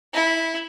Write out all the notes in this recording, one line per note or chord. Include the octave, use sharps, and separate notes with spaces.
E4